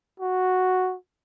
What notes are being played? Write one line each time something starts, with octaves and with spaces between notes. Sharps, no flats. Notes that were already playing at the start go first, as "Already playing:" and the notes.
F#4